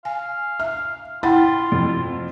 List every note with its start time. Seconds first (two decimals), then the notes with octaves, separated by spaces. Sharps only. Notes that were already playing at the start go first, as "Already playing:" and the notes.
0.05 F5 G#5
0.60 E5 F6
1.23 E4 F4 F#5 G5 B5 A6
1.72 F2